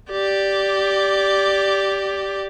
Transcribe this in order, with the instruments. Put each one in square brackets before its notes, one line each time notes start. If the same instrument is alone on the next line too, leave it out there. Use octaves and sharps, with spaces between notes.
[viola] G4 D5